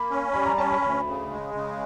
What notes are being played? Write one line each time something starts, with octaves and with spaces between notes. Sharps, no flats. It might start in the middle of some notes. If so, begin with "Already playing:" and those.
Already playing: A#3 B5
C#4
G3 B5
A#5
C#4 A5
B5
D2 B5
C#3
G#3
C#3